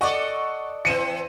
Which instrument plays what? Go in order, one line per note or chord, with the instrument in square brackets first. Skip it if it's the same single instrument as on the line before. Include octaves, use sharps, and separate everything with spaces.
[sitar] A4 D5 D#5 [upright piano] F#5 C#6
[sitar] E3 C4 [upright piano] C#7 D#7 E7